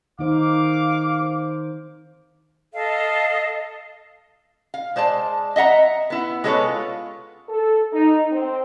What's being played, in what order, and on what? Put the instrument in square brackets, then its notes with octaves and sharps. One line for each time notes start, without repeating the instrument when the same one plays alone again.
[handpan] D#3 D#4 C5 [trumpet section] F5 D6
[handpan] C5
[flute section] A4 D#5 F5
[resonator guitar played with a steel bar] F5
G#3 C5 D5 A5
D#5 E5 F#5 A#5
B3 E4
G#3 B3 A4 B4 C#5
F4
[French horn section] A4
D#4
C4